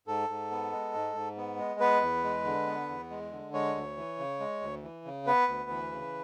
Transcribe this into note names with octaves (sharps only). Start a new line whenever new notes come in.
G#2 A4
G#2
B3
G#3
G#2
G#2
B3
G#3
B3 B4
E2
G#3
D3
B3
E2
G#3
D3
G#3 C#5
D2
E3
C#3
G#3
D2
E3
C#3
B3 B4
D2
E3
C#3